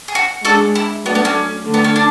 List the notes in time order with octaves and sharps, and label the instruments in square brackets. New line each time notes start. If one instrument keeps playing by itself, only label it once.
[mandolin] G#4
F#4
[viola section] G#3 D4 G#4 [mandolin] F#4 A4
[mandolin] E4
[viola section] F#3 A3 D4 A4 D5 [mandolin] B3
[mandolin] B3
C#4
[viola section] D3 A3 D4
[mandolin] B3
C#4
D4